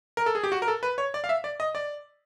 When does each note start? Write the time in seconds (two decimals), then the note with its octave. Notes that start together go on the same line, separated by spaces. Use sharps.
0.17 A#4
0.26 A4
0.35 G#4
0.44 G4
0.52 F#4
0.62 A#4
0.68 A4
0.83 B4
0.98 C#5
1.14 D5
1.24 F5
1.29 E5
1.44 D5
1.60 D#5
1.75 D5